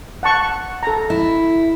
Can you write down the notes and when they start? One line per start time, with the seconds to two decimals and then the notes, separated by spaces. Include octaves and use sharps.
0.23 F#5 A5 C#6
0.83 A4 A#5
1.10 E4